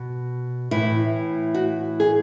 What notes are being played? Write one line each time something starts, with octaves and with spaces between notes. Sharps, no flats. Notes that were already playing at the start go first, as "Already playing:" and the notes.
Already playing: B2
A2 E3 E4
F#4
G#4